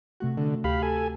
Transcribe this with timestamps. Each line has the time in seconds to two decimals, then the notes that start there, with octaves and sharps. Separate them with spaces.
0.20 C3 A3 F#4
0.38 D3
0.64 D2 G4 F5 B5
0.82 A4 G#5